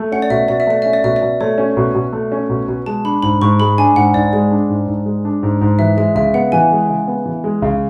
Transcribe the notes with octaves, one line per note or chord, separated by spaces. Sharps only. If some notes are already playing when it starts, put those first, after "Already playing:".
Already playing: A3
C#4 F#5
D5
B2 E5
B2 D5
E5
A3 D5
C#4 E5
D5
B2 E5
D5
B2
A3 C#5
C#4
B2
B2
A3
C#4
B2
B2
G#3 A5
D4 B5
G#2 B5
G#2 C#6
G#3 B5
D4 G#5
G#2 F#5
G#2 D5
G#3 D5
D4
G#2
G#2
G#3
D4
G#2
G#2
E3 E5
G#3 E5
C#3 E5
B3 F#5
E3 G#5
G#3
C#3
B3
E3
G#3
C#3